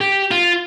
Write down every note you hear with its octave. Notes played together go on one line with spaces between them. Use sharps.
G4
F4